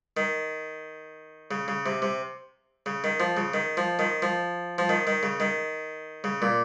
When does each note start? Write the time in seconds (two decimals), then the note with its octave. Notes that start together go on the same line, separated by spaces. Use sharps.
0.17 D#3
1.51 C#3
1.68 C#3
1.86 C3
2.02 C3
2.86 C#3
3.04 D#3
3.20 F3
3.37 C#3
3.54 D#3
3.77 F3
3.99 D#3
4.22 F3
4.78 F3
4.89 D#3
5.07 D#3
5.23 C#3
5.40 D#3
6.24 C#3
6.42 A#2